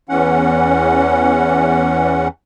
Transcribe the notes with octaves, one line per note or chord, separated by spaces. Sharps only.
E2 E3 C#4 F#5